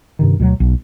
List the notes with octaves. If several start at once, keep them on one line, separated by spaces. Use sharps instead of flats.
G2 C3 D#3
D2 B2 D3 F#3
B1